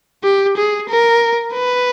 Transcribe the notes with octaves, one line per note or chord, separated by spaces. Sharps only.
G4
G#4
A#4
B4